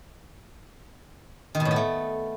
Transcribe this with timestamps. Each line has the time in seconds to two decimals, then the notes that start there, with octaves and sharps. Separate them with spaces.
1.55 D#3
1.60 B2
1.65 A2
1.71 B3
1.76 A3